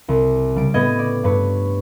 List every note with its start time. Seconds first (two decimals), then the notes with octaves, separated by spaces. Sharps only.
0.08 C2
0.55 C#3 G3 D7
0.74 A2 B3 D#5 G#6
0.99 D5
1.23 G2 B4 C#5